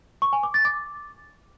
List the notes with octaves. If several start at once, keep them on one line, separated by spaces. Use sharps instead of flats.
C#6
G#5
D6
A6
D6